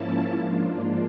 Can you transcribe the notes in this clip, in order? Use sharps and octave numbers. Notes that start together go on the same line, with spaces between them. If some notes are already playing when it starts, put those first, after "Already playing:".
Already playing: G#2 F3 A#3 C#4 E4 A5
G#2 F3 A#3 D4 F4